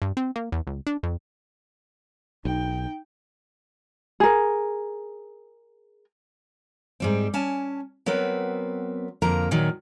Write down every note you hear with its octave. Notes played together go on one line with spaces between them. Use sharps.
G2
C4
A#3
E2
C#2
D4
F2
B1 D#4 G5
G#4 A#4
G#2 G3 C4
C#4 G#5 A5
F#3 B3 C4 A#4 B4
F2 D3 A#3 A#4 A#5
A#2 D#3 F#3